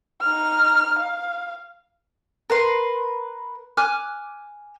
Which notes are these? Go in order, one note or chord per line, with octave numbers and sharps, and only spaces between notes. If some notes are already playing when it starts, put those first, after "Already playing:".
D#4 F6
F5
A#4 B4 C6
G#5 D6 F6 F#6